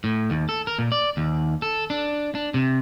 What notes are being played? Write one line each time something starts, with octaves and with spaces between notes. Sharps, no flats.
A2
D#2
A4
A#4
A#2
D5
D#2
A4
D4
D4
C3